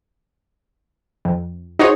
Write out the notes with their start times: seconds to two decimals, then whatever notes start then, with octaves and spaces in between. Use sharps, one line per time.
1.25 F2
1.79 D#4 F#4 G#4 C5 C#5